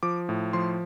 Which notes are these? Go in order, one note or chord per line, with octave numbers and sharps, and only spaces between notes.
F3 D6
A2
F3 C6